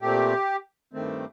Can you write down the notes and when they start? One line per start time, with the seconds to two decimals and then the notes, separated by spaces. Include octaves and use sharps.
0.01 A#2 A3 C4 G4
0.93 G2 D#3 A3 C4